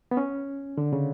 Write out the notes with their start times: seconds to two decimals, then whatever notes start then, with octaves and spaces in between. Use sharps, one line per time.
0.11 B3
0.17 C#4
0.78 D3
0.93 C#3